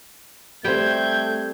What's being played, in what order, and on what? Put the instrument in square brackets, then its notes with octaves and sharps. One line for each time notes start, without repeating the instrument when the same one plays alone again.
[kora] G3 C4 [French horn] A3 [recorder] G6 [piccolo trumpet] G#6